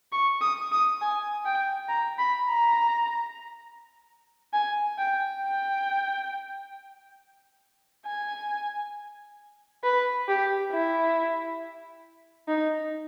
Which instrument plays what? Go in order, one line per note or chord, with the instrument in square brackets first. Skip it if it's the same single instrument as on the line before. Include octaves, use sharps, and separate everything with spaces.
[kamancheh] C#6
D#6
D#6
G#5
G5
A#5
B5
A#5
G#5
G5
G5
G#5
B4
G4
E4
D#4